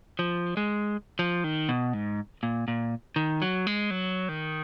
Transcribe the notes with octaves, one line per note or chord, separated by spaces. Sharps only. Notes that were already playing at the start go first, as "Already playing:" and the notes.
F3
G#3
F3
D#3
B2
G#2
A#2
A#2
D#3
F#3
G#3
F#3
D#3